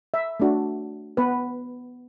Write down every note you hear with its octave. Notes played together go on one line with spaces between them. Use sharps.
E5
A3 D4 F#4
B3 B4